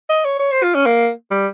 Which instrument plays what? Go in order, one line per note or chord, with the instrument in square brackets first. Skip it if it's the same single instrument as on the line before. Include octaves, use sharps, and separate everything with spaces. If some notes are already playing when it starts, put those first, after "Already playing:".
[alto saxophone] D#5
C#5
C#5
C5
F4
C#4
A#3
G3